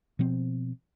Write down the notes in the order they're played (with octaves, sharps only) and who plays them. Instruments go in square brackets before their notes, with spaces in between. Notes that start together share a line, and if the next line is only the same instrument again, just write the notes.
[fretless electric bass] B2 F3 C4